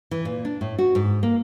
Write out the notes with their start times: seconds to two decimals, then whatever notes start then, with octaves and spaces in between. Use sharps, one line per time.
0.11 E3
0.25 A#2
0.45 D4
0.61 A2
0.78 F#4
0.95 G#2
1.23 A#3